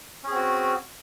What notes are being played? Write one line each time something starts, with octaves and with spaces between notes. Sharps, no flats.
C4 C#4 F#4 G#4